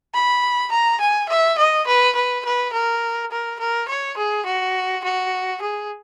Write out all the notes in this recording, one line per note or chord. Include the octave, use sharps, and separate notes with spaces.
B5
A#5
G#5
E5
D#5
B4
B4
B4
A#4
A#4
A#4
C#5
G#4
F#4
F#4
G#4